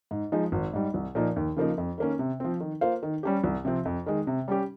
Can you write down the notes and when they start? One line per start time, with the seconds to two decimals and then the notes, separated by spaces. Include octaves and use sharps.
0.11 G#2
0.32 F3 G#3 D#4
0.52 G#1
0.73 G#2 G3
0.94 C2
1.15 A#2 F3 A#3 D#4
1.36 D#2
1.56 C#3 F3 A#3 D#4
1.78 F2
1.98 D#3 A#3 C#4
2.19 C3
2.40 F3 C4
2.60 D#3
2.81 A#3 F4 C5 F5
3.03 D#3
3.23 G3 C#4 G4
3.44 C2
3.65 C3 F3 C4
3.85 F2
4.06 D#3 G#3
4.27 C3
4.48 G3 C#4 G4